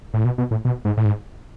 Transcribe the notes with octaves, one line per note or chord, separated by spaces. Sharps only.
A2
B2
B2
A2
B2
G#2
A2
G#2